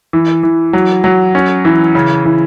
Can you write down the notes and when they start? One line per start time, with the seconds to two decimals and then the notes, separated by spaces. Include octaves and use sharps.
0.13 E3
0.43 E3
0.73 F#3
1.04 F#3
1.35 C#4
1.65 E3
1.95 C#3
2.25 E3